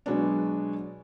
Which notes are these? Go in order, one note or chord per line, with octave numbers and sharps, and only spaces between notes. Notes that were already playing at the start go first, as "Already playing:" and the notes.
B2 F#3 G#3 B3 D4